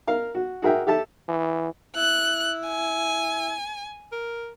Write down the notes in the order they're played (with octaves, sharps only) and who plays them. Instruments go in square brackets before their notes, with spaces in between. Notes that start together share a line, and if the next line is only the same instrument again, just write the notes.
[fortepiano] A#4 F5
F#4
F#4 G#4 A#4 E5 G5
G4 A4 E5 A5
[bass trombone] E3
[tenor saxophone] E4 [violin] F#6
[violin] G#5
[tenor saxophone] A#4